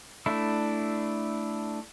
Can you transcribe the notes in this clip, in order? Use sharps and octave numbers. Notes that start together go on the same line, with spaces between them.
A3 D4 E4